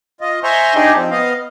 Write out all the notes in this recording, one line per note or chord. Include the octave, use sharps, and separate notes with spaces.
F4 D#5
C5 E5 G#5 A#5 C6 C#6
D4 D#4 G4 G#4 D#5
F3 C4
B3 D#5 F5